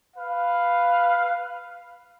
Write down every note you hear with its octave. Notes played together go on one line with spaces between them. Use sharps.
B4 F5